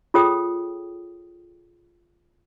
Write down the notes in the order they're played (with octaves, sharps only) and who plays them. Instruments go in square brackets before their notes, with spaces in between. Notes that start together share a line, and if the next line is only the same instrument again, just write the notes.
[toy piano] F4 G#4 A4 C#5 G5 D#6